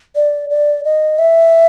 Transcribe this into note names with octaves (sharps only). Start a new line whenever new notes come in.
D5
D5
D#5
E5